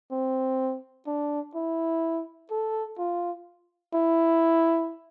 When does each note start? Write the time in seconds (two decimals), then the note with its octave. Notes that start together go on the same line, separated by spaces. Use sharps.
0.11 C4
1.07 D4
1.55 E4
2.51 A4
2.99 F4
3.94 E4